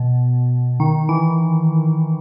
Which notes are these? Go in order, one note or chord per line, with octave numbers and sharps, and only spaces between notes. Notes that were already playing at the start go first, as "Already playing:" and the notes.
Already playing: B2
D#3
E3